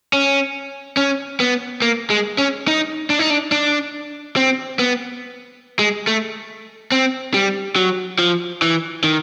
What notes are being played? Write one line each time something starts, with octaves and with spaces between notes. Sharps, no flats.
C#4
C#4
B3
A#3
G#3
C#4
D#4
D4
D#4
D4
D4
C4
B3
G#3
A3
C4
G3
F#3
F3
E3
D#3